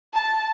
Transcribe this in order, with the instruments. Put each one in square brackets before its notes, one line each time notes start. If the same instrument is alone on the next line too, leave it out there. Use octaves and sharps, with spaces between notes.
[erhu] A5